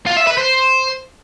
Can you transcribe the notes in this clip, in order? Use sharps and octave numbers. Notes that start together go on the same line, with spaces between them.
F4
E5
B4
C5